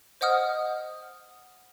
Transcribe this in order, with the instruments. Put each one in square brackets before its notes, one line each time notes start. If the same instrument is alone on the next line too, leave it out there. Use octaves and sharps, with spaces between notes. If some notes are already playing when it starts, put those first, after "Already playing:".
[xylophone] C5 D#5 F#5 D#6 F6